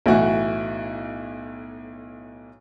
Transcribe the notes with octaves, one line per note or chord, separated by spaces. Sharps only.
B1 A2 E3 E4 F#4